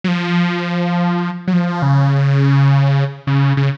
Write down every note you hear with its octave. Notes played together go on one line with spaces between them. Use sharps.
F#3
F3
F#3
F3
C#3
C#3
C#3